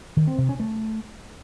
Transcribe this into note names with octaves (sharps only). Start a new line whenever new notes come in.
D#3
C4
C3
C#4
A3